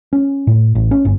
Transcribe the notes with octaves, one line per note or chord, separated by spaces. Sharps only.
C#4
A2
A1
C#4
G1